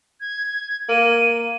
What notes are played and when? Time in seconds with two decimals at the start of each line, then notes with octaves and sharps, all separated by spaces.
0.20 G#6
0.89 A#3 D#7